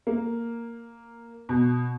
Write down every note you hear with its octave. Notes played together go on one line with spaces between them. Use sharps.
A#3
B2